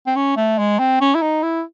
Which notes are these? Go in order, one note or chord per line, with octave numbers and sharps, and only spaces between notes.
C4
C#4
A3
G#3
C4
C#4
E4
D#4
E4